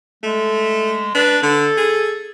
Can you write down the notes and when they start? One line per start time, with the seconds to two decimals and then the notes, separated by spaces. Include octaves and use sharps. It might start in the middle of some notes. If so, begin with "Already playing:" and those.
0.23 G#3 A3
1.15 D4 B4
1.43 D3 A4
1.77 G#4